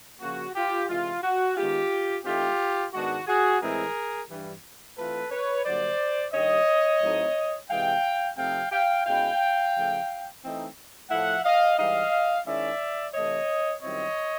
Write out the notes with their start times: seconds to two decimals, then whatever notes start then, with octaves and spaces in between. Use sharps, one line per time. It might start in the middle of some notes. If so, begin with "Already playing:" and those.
0.20 C#3 F3 A#3 C#4 F#4
0.55 F4 G4
0.89 C3 E3 G#3 F4
1.24 F#4
1.57 D#3 G#3 B3 F4 G4
2.25 E3 A3 C4 D#4 F4 G4
2.93 G#2 D#3 G#3 B3 D4 F#4
3.27 F#4 G#4
3.61 A2 E3 G#3 C4 E4 G#4 A#4
4.30 G2 E3 G3
4.98 E3 A3 C4 F4 A4 B4
5.32 B4 C#5
5.65 G2 D3 F#3 A#3 C5 D5
6.33 G2 D#3 G3 C#5 D#5
7.02 A2 F#3 A3 C4 D#4
7.69 C3 E3 G#3 F5 G5
8.37 C3 F3 A3 C4 D#4 F5 G5
8.72 F5 G5
9.06 B2 G#3 C#4 E4 F5 G5
9.74 C#3 F3 A3
10.42 E3 A3 C4 D#4
11.10 A2 F3 A3 E5 F#5
11.44 D#5 F5
11.78 G#2 E3 G3 D#5 F5
12.46 D#3 G#3 C#4 E4 D5 E5
13.14 C3 E3 A3 C#5 D#5
13.82 F#2 D#3 G3 C4 E4 C#5 D#5